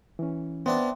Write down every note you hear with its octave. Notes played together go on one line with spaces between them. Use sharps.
E3 C#4
B3 C4 D4 E5 G5 A5 C6